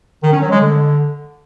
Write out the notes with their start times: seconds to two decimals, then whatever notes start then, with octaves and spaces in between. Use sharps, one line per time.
0.23 D#3
0.32 C#4
0.42 F#3
0.51 G#3
0.60 D3